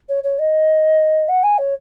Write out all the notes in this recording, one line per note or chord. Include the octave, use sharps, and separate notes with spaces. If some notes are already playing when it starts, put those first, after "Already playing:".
C#5
C#5
D#5
F#5
G#5
C#5